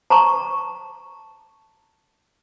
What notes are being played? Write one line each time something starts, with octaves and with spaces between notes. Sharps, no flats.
A5 A#5 C#6